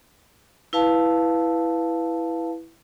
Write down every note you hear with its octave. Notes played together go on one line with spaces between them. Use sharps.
E4 B4 F5 A5